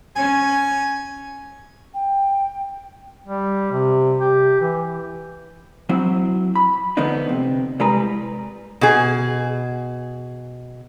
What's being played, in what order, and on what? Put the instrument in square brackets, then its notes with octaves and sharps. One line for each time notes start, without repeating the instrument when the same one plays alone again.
[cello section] C#4 [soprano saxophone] G#5
[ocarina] G5
[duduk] G3
C3
G4
E3
[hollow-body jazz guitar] F#3 C4 E4
B5
D3 F3 A3 B3 D4 D#4
C3
C2 G3 G#3 E4 B4 A#5
[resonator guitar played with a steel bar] B2 G#4